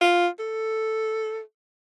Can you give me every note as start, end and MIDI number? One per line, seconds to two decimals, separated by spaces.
0.01 0.27 65
0.40 1.40 69